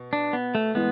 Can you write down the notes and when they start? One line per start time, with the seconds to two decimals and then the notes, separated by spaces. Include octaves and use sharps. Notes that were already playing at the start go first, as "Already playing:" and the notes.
Already playing: B2
0.13 D4
0.33 B3
0.55 A3
0.75 A2 E3 G#3 B3